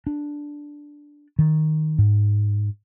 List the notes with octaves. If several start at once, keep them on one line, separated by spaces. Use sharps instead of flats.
D4
D#3
G#2